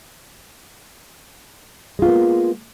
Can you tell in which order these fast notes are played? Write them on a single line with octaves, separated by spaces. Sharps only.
G#3 F4 B3 A#3